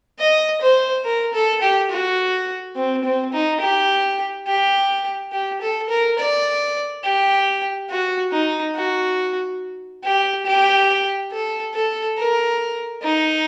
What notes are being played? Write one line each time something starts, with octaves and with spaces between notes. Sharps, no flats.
D#5
C5
A#4
A4
G4
F#4
C4
C4
D#4
G4
G4
G4
A4
A#4
D5
G4
F#4
D#4
F#4
G4
G4
A4
A4
A#4
D#4